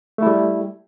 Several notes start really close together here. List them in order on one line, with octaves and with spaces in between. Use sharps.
A3 E4 G3